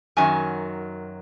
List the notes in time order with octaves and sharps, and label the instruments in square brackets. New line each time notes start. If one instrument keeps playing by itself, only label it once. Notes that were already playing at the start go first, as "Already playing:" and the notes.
[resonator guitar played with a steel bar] F#2 D#3 F#3 G#5